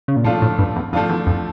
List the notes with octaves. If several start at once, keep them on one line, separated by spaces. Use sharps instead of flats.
C#3
A#2
A2 F3 A3 D4 F4
A2
G2
E2
F2 F3 A3 D4 F4
E2
F2